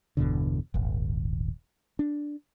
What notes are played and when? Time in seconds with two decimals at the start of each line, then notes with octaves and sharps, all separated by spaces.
0.17 G1 E2 B2 D3
0.74 D#1 G#1
1.99 D4